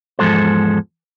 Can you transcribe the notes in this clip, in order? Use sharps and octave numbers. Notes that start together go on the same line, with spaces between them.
E2 G#2 F3 G#3 A4 C5